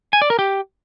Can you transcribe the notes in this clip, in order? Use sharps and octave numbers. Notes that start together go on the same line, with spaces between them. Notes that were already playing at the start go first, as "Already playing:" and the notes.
G#5
D5
A#4
G4